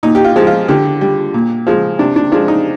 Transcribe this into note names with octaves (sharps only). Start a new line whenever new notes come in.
A#2 D#4
G4
F4
F3 G#3
F4
D3 G4
G3
A#2
F3 G#3
C3 D4
D4
F3 G#3 D4
D#4